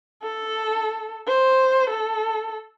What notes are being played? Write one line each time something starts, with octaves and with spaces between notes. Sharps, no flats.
A4
C5
A4